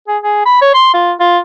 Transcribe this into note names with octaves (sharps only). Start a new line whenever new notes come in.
G#4
G#4
B5
C#5
C6
F4
F4